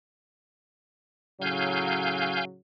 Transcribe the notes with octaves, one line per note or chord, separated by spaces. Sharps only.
A2 C#3 F#3 F5 G#5 G6